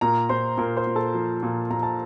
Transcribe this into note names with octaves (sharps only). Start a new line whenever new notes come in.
A#2 A#4 A#5
A#2 C5 C6
A#2 A#4 A#5
C5 C6
A#2
A4 A5
F3
A#2
A#2 A#5
A5